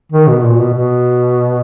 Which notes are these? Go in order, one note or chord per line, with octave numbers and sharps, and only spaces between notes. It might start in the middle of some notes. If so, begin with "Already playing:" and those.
D#3
B2
A#2
B2
B2